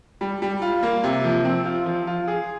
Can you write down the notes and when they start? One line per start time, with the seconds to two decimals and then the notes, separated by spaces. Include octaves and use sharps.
0.21 G3
0.42 G3
0.62 F4
0.83 A#3
1.03 C3
1.24 F3
1.45 C4
1.65 F4
1.86 F3
2.07 F4
2.28 G#4